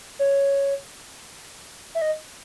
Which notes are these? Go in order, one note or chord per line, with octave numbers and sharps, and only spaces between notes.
C#5
E5
D#5